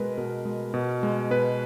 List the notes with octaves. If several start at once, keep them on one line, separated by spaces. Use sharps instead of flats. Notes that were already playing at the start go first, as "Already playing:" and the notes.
Already playing: B2 G#3 A#4 B4
B2 A#4
G#3
B2
G#3
B2 B4